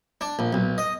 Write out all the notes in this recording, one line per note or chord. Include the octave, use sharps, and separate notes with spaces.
D4
A#1
B1
D#5